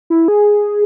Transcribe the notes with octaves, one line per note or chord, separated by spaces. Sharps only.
E4
G#4